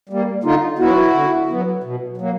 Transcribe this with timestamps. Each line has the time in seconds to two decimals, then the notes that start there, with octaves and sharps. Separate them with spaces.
0.09 G3 A#3
0.44 D3 D#4 F4
0.79 F#3 B3 E4 F#4
1.14 D3
1.49 F#3 B3
1.84 B2
2.17 F#3 A#3